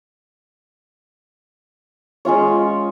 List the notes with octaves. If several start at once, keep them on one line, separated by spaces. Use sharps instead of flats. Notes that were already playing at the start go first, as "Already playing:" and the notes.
G#3 C#4 F4 C#5